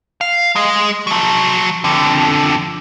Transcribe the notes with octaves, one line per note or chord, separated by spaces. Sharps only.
F5
G#3 D#5
F3 F#3
F2 D3